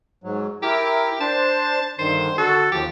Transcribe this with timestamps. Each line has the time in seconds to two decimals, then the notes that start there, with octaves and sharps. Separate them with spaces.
0.24 G#2 F#3
0.62 E4 G4 A#4
1.20 D4 C5 A5
1.99 G2 D3 D#3 C5
2.38 D3 F#4 A4
2.72 D#2 F3 G4